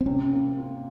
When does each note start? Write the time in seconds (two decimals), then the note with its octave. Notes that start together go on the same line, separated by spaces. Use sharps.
0.01 C4
0.06 C3 C#4
0.33 A#3
0.58 F4